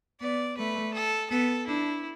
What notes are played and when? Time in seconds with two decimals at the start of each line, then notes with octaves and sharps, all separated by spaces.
0.21 B3 D5
0.58 A3 B4
0.94 A4
1.30 B3 A4
1.67 D4 E4